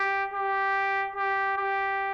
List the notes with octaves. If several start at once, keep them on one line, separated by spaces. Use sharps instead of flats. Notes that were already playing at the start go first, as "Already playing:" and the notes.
Already playing: G4
G4
G4
G4